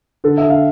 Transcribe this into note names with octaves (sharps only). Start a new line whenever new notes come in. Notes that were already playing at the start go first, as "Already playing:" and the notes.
D3 A4
E5
D3
F5